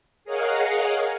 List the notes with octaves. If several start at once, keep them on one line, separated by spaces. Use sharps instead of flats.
G#4 A#4 C#5 D#5 F5 F#5